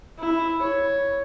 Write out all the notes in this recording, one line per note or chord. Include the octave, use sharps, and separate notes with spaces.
E4
C#5